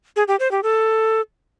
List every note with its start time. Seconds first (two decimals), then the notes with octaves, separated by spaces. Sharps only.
0.16 G#4
0.28 G4
0.39 C5
0.51 G4
0.63 A4